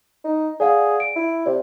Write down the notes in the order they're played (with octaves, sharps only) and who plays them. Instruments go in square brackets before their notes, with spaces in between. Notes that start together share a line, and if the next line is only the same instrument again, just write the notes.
[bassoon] D#4
[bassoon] G#4 [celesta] D5 F5 F#5
[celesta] D7
[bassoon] E4
[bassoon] C3 [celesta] D5